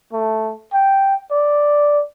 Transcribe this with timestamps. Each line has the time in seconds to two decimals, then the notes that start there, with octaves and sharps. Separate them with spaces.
0.13 A3
0.73 G5
1.31 D5